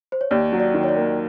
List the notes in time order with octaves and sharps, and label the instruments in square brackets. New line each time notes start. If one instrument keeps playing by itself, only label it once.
[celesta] C5
C#5
[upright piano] D#2 [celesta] D5
[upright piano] F#3
[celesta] D5
[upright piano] D#3
[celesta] C#5
D5
[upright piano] A#3